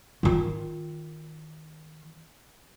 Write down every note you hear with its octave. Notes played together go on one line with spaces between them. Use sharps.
D#3 F4